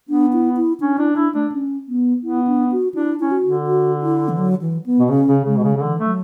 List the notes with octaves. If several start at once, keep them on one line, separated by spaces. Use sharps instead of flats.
B3 D4
E4
E4
C#4 D4
D4 E4
D4 E4
A3 D4
C#4
B3
B3 E4
D4
F#4
D4 E4
C#4 E4
F#4
D3
F#4
E4
E3
F#3
E3
B3
B2
C#3 C#4
C#3
C#3 G#3
B2
C#3
C#3
D3 E3
A3
F#3